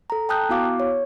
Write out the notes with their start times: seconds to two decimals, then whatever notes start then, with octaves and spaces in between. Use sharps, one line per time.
0.10 A4 A#5
0.29 G5 A5 A#5 D#6 F#6 G6
0.49 B3 E4 F#4 F5 D6
0.80 C#5